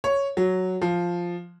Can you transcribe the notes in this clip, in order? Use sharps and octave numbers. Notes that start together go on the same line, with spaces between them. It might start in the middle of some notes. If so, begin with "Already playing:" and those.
C#5
F#3
F3